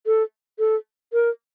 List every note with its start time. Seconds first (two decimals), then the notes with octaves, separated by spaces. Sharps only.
0.07 A4
0.59 A4
1.13 A#4